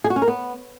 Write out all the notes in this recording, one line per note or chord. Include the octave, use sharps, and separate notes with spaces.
G#4
F#4
C#4
A#4
B3